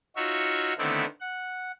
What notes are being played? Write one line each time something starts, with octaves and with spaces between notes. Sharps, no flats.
D#4 F4 F#4 C#5 E5
D3 D#3 A3 B3 C4 E4
F#5